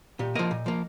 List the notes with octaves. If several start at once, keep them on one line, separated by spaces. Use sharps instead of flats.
A#2 G4
F3 A#3 D#5
A#2
F3 A#3